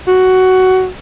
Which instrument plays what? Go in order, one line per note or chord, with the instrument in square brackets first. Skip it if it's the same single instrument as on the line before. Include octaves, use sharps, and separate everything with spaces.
[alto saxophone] F#4